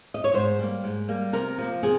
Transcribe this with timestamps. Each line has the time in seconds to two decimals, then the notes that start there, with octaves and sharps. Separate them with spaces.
0.14 D#5
0.24 C#5
0.34 G#2 C5
0.59 G3 A#3
0.84 G#2
1.08 G3 A#3
1.33 C3 A#4
1.58 F3 A#3
1.83 C3 G#4